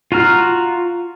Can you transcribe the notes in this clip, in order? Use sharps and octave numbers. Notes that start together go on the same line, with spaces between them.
F4 F#4 A#5 F6